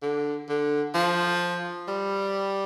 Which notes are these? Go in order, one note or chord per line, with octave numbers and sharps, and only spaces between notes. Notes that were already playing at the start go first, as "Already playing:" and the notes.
D3
D3
F3
G3